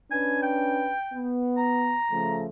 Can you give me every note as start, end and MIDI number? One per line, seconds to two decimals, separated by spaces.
0.11 0.92 61
0.11 0.92 62
0.11 0.92 71
0.11 0.40 80
0.43 1.26 79
1.13 1.95 59
1.57 2.39 82
2.12 2.47 49
2.12 2.47 53
2.12 2.47 57